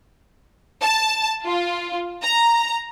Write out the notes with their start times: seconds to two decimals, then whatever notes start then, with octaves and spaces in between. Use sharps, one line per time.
0.81 A5
1.45 F4
2.22 A#5